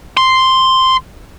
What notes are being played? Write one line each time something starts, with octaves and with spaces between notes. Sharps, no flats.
C6